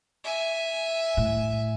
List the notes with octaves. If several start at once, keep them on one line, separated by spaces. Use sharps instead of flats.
E5 G#5
A2